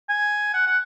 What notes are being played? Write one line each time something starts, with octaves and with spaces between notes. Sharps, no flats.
G#5
F#5
F#5